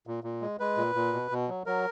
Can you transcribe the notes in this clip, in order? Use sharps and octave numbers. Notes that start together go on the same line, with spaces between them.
A#2
A#2
G#3
G#3 B4
A#2
A#2
B2
B2
F#3
F#3 A#4